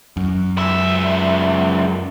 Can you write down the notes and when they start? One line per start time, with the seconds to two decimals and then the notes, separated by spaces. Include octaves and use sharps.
0.17 F#2
0.57 C#2 E5